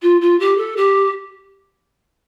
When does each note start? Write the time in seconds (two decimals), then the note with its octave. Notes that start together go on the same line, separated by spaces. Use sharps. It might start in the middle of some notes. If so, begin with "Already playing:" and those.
0.02 F4
0.21 F4
0.40 G4
0.57 A4
0.77 G4